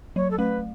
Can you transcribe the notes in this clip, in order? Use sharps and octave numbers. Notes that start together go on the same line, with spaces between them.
F#3 C#5
A4
A3 B4